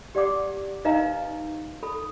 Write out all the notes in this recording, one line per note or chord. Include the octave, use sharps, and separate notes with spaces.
G4 D5 F#5 D6
D#4 B4 D#5 F5 A#5
A4 B5